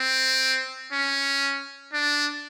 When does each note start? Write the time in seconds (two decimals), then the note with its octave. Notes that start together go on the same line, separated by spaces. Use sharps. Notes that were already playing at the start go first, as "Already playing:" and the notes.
Already playing: C4
0.93 C#4
1.93 D4